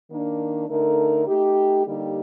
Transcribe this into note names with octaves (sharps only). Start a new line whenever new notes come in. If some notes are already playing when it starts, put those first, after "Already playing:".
D#3 A#3 D4
D3 A3 D#4 A#4
A3 D#4 G4
D3 G3 A#3 D#4 G4